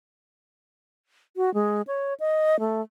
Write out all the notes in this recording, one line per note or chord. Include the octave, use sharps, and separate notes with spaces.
F#4
G#3
C#5
D#5
A3